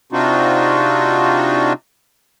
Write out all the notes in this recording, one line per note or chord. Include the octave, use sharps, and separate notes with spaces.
C3 C4 D4 D#4 F4 F#4